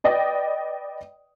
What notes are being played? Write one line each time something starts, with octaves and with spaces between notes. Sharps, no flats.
B4 D5 D#5 G5